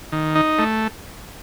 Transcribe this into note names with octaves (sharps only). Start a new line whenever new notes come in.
D#3
D#4
A3